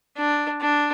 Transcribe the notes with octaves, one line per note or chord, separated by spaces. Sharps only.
D4
D4